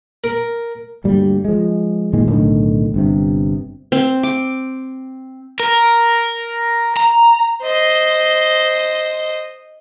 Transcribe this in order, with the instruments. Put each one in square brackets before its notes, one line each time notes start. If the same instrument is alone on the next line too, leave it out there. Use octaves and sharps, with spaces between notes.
[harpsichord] A#4
[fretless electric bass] D2 G2 G3 A#3
F3 G#3
A#2 D#3 G#3
B1 A2 D3 D#3
G1 G2 C3
[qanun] C4
D6
[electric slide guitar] A#4
A#5
[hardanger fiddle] C5 D#5